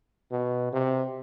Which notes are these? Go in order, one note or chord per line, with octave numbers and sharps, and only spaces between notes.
B2
C3